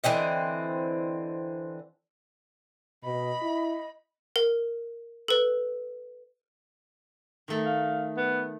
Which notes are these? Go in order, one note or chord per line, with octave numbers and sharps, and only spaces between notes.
D3 E3 C4 D#5
B2 D#5 B5
E4
A#4
A4 B4
D#3 A3 A#5
F5
B3